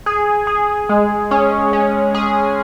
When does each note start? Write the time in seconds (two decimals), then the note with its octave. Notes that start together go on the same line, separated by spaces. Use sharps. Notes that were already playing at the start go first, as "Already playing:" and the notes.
0.06 G#4
0.47 G#4
0.89 G#3
1.31 C#4
1.73 C#4
2.15 G#4